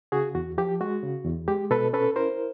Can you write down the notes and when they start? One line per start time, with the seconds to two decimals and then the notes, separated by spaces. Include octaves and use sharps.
0.12 C#3 F#4 G#4
0.35 E2 F#4
0.58 F3 G4
0.81 G#3 F#4
1.03 C#3
1.25 E2
1.48 G#3 G4
1.71 B2 A4 B4
1.93 C#4 A4 B4
2.16 E4 A#4 C5